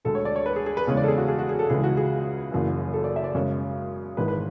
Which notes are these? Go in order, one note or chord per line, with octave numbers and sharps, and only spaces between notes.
D2 D3 G#3 A4
C#5
D5
C#5
B4
G#4
G#4
B4
E2 C#3 G#3 C#5
D5
A4
G#4
F#4
G#4
F#4
G#4
A4
C#2 C#3 E3 G#3 G#4
F#4
G#4
F#1 F#2 E3
A4
D5
E5
D5
F#2 C#3 G#3 C#5
G#1 G#2 E3 G#3 B4
B4